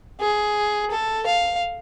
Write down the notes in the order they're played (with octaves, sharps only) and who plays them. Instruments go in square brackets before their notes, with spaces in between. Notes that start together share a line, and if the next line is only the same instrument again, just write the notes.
[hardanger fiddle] G#4
A4
F5